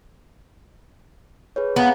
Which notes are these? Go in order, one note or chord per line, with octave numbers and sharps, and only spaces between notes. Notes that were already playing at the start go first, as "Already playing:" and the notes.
G#4 B4 C#5
B3 F5 G#5 A#5